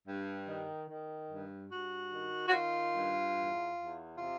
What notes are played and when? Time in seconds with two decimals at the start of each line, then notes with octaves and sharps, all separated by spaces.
0.08 G2
0.48 D#3
0.89 D#3
1.30 G2
1.71 G2 F#4
2.12 D#3
2.48 F#4
2.53 D#3 F4
2.94 G2
3.35 E2
3.76 E2
4.18 C3 F4